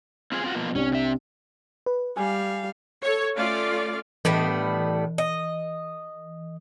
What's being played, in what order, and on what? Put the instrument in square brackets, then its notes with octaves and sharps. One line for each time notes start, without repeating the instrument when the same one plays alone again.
[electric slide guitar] C4 F4 G#4
C4 F4 F#4
B2 F3 A#3
[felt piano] C2 D4 G4 [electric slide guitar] C#4
[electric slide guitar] C3 E5
[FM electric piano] B4
[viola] G3 F5 [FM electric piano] G#5
[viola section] A4 C#5
A3 C#4 F4 D5 F5
[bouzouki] A2 G3 B3 [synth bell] E3
[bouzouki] D#5